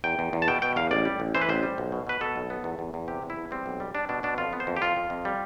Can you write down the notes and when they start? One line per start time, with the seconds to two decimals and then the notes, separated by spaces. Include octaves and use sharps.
0.04 E2 G5
0.19 E2
0.33 E2
0.42 A5
0.48 B2 G5
0.62 B2 G5
0.76 E2 F5
0.91 A1 D5
1.05 G3
1.20 A1
1.35 E3 C5
1.41 B4
1.49 A1 C5
1.63 G3
1.78 B1
1.92 B2
2.07 B2 B4
2.21 B2 A4
2.36 B1
2.50 B3
2.64 E2
2.79 E2
2.94 E2
3.08 C3 G4
3.22 E2
3.30 E4
3.36 E2
3.51 G3 C4
3.66 B1
3.80 G3
3.94 G3 D4
4.09 B2 D4
4.23 B2 D4
4.38 F2 F4
4.53 B3
4.60 C5
4.67 F2
4.76 G4
4.82 F2 F4
4.96 F2
5.10 F2
5.25 G3